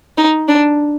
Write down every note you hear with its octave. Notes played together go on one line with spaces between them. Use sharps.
D#4
D4